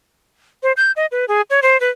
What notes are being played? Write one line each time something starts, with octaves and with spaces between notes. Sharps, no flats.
C5
G6
D#5
B4
G#4
C#5
C5
B4